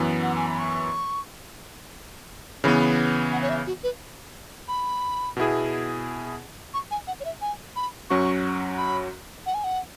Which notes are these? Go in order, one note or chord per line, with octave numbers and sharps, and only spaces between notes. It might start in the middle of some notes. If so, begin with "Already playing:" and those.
Already playing: F#2 E3 B3
F#5
G#5
B5
C#6
C#3 E3 B3 B5
F#5
C#5
E5
F#4
B4
B5
B2 B3 E4 G#4
C#6
G#5
F#5
C#5
E5
G#5
B5
F#2 F#3 C#4 F#4 C#6
B5
F#5
G#5
F#5